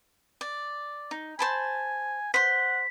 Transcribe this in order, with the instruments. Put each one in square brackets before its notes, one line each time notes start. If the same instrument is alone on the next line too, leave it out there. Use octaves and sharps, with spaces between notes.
[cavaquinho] D5
D#4
[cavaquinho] C5 A5 B5 [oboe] G#5
[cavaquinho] C5 C6 [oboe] F#5 [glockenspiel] B6